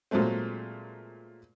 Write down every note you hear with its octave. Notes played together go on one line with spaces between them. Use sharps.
A#2 F#3 G#3 A3 C4